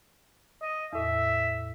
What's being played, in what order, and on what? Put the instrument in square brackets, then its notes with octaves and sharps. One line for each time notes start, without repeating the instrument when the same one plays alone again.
[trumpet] D#5
[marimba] E2 A2 [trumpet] E5